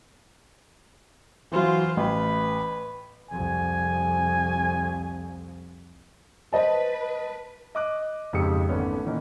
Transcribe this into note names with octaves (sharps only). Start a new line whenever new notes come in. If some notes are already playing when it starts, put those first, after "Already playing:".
E3 F#3 F4 C5
A1 B4
C2 F2 G#5
B4 C5 D#5 A5
D#5 D6 F#6
F2 G#2 C#3 G4 D#6 C#7
G#1 D3 A3 B3 C#4
A#2 D#3 E3 C#4 D#4